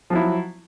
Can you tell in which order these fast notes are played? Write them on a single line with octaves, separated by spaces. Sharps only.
F3 F#3 E4